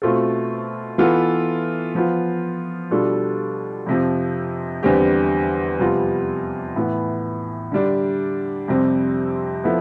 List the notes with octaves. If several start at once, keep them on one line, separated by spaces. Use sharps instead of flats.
B2 A3 C4 F4 A4
E3 B3 F4 A4
F3 B3 F4
B2 G3 D4 F4 A4
F2 C3 F3
E2 D3 G3 C4 G4
F2 C3 G3 B3 F4
A2 E3 B3
D3 G3 D4
F2 C3 G3 C4
F3 B3 E4 A4